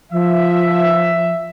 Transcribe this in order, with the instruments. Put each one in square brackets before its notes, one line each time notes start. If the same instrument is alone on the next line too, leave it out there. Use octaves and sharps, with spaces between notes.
[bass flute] F3 [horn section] E5